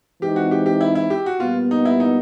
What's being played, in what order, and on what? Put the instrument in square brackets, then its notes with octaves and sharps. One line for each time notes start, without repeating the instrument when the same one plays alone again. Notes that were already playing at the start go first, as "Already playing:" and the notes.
[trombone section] E3 G#3 C4 D#4 [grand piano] G4
[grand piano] F#4
G4
G4
E4
E4
G4
F#4
[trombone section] A#2 G3 B3 [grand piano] F4
[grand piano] D#4
E4
D#4